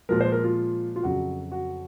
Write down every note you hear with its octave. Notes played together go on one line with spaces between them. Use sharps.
A#2 F3 G#3 A#4
C5
A#4
F4
F4
F2 C#3 F#3 F#4
F#4